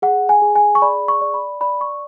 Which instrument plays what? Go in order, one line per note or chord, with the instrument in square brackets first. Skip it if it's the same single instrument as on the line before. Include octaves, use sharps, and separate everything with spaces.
[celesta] G#4 F#5
G#5
G#4
G#5
C#6
D5 B5
C#6
D5
B5
D5 B5
C#6